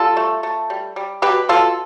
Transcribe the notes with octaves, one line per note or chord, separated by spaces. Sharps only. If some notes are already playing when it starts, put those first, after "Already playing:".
Already playing: G3 F4 A4
A3
A3
G3
G3
B2 G4 B4
B2 F4 A4